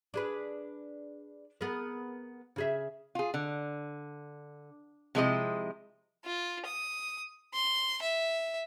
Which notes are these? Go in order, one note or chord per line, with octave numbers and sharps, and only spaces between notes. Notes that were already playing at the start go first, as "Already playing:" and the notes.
D4 G#4 B4
B3 G#4 A#4
C#3 G#4 E5
F4 G#4
D3
C3 F3 G#3 E4 G#4 D#5
F4
D#6
C6
E5